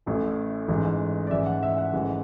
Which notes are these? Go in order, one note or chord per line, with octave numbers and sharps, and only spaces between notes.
A1 A2 E3
A1 G#2 E3
D5
A1 G#2 E3 E5
F#5
E5
F#5
A1 G#2 E3